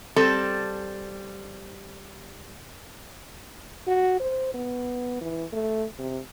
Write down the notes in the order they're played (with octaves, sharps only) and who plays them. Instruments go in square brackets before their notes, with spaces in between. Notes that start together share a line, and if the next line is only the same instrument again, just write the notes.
[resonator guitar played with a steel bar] G3 C4 A4
[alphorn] F#4
C5
B3
E3
A3
C3